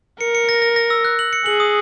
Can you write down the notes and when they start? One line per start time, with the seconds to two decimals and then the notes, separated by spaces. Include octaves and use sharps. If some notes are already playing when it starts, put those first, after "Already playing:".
0.21 A#4 C#7
0.35 C#7
0.49 A#6
0.62 A#6
0.76 A#6
0.90 E6
1.05 F#6
1.19 F#7
1.33 C#7
1.46 G#4 F#7
1.60 D#6